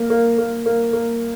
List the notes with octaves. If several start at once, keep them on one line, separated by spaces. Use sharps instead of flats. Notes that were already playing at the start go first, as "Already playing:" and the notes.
Already playing: A#3
A#3
A#3
A#3
A#3